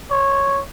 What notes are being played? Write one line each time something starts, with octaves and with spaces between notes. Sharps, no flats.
C#5